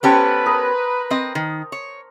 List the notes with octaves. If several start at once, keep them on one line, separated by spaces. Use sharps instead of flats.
B3 C#4 G4 A4 B4 C5
A#4 D#6
C4 D#5
D#3
C#5